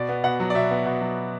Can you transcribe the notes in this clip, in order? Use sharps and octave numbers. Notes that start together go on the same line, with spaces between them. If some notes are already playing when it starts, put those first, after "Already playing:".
Already playing: B2 D5
B3
B2 F#5
F#3
D5
B2 E5
B3
B2
F#3